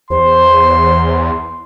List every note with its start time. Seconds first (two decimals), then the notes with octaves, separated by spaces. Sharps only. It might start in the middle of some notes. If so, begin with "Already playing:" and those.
0.10 E2 C5 C6